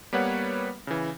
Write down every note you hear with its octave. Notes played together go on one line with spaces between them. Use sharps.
G3 A#3 B3 B4 C#5 F#5
C#3 E3